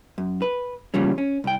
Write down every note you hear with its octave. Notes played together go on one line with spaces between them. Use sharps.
F#2
B4
E2 A#2 C#3 F3 G3 C#4
C#4
C2 G5